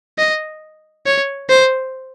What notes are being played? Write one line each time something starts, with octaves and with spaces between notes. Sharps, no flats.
D#5
C#5
C5